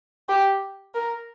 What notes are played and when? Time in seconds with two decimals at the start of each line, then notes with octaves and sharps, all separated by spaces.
0.29 G4
0.94 A#4